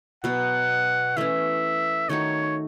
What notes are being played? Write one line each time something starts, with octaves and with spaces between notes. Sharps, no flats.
B2 F#3 B3 F#5
E3 A3 C#4 E5
D#3 A3 D#4 F#4 C#5